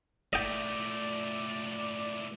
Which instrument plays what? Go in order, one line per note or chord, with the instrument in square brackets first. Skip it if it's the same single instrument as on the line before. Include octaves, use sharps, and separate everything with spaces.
[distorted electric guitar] A#2 A3 [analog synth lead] D5 [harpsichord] D#5 G5